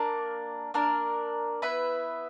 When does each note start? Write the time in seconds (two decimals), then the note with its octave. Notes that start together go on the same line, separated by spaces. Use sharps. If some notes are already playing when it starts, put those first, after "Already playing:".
Already playing: A#3 D4 A#4
0.74 A#3 D4 A#4
1.62 B3 E4 B4 E5